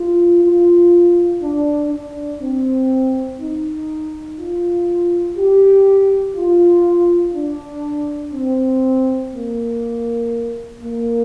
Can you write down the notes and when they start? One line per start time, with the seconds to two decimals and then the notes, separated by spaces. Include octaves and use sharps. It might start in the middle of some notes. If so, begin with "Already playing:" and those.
Already playing: F4
0.43 F4
1.42 D4
1.91 D4
2.41 C4
3.39 D#4
4.38 F4
5.37 G4
6.36 F4
7.34 D4
8.33 C4
9.32 A#3
10.81 A#3